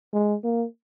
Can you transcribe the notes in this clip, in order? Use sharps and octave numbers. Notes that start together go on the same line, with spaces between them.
G#3
A#3